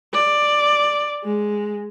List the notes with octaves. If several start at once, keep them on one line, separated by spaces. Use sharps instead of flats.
D5
G#3